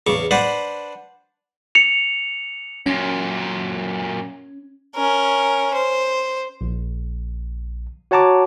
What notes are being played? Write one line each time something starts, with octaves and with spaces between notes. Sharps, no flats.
E2 C#3 C#6 D6
D4 B4 C5 D5 F#5
C#7 F7
F#2 A#2 C#4
C#4 A#4
C5
A#1
F#4 C#5 F#5 A5 A#5 D6